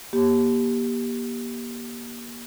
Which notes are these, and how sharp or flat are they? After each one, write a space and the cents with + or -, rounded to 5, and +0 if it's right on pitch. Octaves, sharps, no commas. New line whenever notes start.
A#3 +35 G4 +0